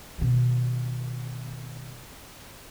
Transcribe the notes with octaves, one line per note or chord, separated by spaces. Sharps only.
B2 D#3